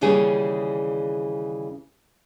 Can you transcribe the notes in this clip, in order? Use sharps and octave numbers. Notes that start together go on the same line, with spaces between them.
D#2 C#3 E3 G3 G#4 C#5